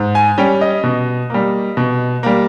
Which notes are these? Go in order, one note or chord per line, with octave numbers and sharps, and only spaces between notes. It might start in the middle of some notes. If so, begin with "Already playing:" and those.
Already playing: G#2
G#5
G3 C#4 G5
D#5
B2
G3 A#3
B2
G3 A#3